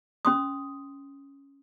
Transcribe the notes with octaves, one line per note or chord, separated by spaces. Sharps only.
C#4 C6 D#6